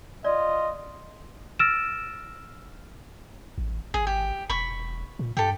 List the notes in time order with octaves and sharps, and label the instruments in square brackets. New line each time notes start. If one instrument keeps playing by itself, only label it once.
[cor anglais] F4 [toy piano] D5 [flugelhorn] D#5
[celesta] E6 F6 A6 A#6 D7 E7
[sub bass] A1
[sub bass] G#1 [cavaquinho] G#4
[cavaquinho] G4
[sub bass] E1 [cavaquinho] B5 C#6
[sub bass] A#2
[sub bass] G2 [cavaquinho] G4 A4